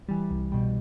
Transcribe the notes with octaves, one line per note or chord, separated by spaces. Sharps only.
E3 G3
C2
B2 G3